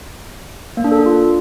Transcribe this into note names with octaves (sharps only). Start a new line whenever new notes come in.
A#3
D4
A4
D4
F4